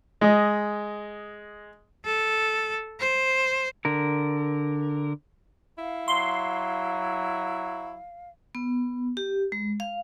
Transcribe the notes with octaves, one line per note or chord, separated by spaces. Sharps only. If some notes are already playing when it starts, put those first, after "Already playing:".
G#3 D#5
A4
C5
D3 A#4
E4 F5
F#3 C6
B3
G4
G#3
F5